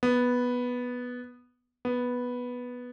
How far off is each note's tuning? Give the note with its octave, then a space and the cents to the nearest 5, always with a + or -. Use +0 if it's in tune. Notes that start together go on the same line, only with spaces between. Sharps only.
B3 -5
B3 -5